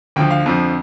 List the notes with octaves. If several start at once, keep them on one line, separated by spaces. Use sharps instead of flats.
D2 D3 F3 G5
F5
F2 D3 F3